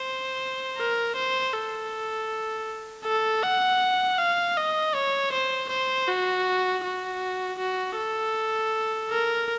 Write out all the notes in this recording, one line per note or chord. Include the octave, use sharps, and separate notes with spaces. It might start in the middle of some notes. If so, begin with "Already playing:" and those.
Already playing: C5
A#4
C5
A4
A4
F#5
F5
D#5
C#5
C5
C5
F#4
F#4
F#4
A4
A#4